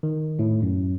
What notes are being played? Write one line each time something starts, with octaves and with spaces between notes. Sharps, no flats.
D#3
A2
F#2